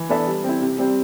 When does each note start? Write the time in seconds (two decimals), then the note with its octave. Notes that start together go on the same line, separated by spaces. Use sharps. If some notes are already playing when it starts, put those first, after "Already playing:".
Already playing: E3
0.09 B3 D4 A4 E5
0.27 G3
0.44 C4 E4
0.61 C3
0.78 G3 C4